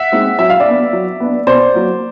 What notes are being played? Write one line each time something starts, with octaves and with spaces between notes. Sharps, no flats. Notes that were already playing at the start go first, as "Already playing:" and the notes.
Already playing: E5 F#5
G#3 C4 D#4
F#3 E5
F5
D5 E5
B3 D4
F#3
B3 D4
B2 C5 D5
F#3 A#3